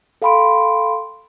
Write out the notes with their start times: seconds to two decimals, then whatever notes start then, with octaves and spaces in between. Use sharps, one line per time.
0.22 A4 F5 G5 B5 C6 D7